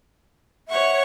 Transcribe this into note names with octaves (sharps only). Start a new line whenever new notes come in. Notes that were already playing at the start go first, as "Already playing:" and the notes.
C#5 E5 F#5 C#6